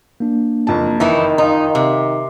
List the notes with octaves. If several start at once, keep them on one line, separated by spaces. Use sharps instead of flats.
A#3 D4
F#1 F2 A5
D#3 E3 D#4 E4
D#4 F5 C6
C3